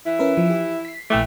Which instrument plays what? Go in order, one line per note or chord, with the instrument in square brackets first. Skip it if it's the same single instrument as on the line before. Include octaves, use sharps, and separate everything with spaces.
[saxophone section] E3 E4
[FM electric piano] C#4 A#4 B4
F3
G4
B6 C7
[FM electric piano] A#1 G5 D6 [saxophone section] E3 A3